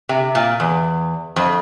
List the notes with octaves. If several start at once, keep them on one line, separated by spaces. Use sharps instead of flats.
C3
A#2
E2
F2